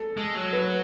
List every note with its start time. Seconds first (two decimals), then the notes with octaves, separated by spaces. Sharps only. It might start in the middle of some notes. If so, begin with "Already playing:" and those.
Already playing: A4
0.17 G#3
0.35 F#3
0.53 B4